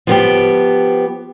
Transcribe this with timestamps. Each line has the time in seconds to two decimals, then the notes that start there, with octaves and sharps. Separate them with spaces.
0.07 F3 B3 G4